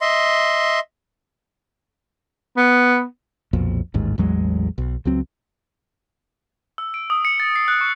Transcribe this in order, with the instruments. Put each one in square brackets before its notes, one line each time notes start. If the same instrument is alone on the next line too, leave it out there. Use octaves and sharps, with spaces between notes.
[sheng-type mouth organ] D#5 E5 C6
[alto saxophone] B3
[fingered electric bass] B1 F2 A#2
A1 D#2 G#2
A1 E2 F#3 G#3
B1
C#2 F#3 C4
[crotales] E6
D7
D#6
C#7
A6
C7
F#6
C#6